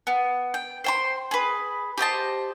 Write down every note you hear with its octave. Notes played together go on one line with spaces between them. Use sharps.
B3
G5
C5 G5 C6
G#4 B4
G4 C5 D#5 A5